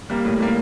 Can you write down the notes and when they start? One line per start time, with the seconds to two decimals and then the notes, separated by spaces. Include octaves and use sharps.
0.10 G3 A#3
0.25 A2
0.40 G3 A#3